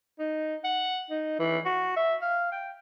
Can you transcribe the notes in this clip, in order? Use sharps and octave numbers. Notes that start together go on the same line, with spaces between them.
D#4
F#5
D#4
E3
F#4
E5
F5
G5